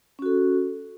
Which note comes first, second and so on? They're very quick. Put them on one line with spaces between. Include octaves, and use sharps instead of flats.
C#4 F#4 A4